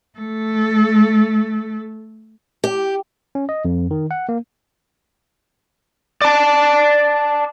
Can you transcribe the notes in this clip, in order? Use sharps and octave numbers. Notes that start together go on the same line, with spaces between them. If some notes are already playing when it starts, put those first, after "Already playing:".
A3 A4
G4
C#4
D#5
F2
D#3
F#5
A#3
D5 A5